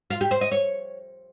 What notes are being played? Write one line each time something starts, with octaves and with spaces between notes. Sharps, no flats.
F4
G4
C5
D#5
C#5